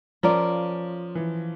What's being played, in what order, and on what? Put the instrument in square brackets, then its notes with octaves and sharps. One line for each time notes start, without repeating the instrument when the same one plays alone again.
[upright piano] F3 [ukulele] C#4 F4 A#4 D5
[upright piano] E3